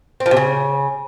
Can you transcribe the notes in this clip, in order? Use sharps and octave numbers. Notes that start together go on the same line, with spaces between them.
C4
F3
C3
C#3